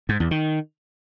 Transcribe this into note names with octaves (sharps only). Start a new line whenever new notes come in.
G#2
E2
D#3